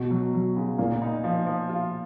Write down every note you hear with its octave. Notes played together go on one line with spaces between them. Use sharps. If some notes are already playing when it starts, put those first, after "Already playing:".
Already playing: B2
F#3
F#3
C#3
A#2 A#3
D#4
F3
F3
F4